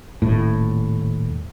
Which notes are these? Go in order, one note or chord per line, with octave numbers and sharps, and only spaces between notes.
D#1 A2